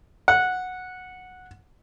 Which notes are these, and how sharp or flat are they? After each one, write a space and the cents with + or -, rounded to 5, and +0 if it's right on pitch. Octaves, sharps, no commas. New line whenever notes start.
F#5 -10